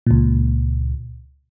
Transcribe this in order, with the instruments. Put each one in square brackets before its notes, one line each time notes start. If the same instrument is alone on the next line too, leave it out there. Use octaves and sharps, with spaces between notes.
[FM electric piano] C#2 A#2